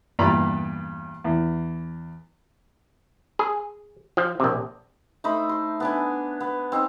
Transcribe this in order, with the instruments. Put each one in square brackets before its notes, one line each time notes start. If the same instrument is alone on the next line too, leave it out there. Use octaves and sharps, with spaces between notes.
[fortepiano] E2 G2 A#2 D5 A#5 B5
E2
[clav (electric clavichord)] G#4
F3
A#1 C3
[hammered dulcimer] A3 D#4 C5 B5
C6
B3 D4 G#5
B3
C4 D#4